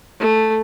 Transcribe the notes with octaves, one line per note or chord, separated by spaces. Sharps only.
A3